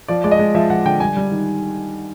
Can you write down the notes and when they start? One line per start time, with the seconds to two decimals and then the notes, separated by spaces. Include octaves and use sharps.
0.08 F3 D5
0.24 G#3 D5
0.31 D#5
0.39 G#3
0.55 F3 E5
0.70 F3 F#5
0.85 D3 G5
1.00 G3 G#5
1.17 G3
1.32 D#3